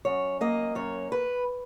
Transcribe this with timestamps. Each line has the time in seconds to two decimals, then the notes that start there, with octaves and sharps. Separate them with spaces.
0.05 F#2 C#5
0.41 A#3 D#5
0.75 F#2 C#5
1.12 B4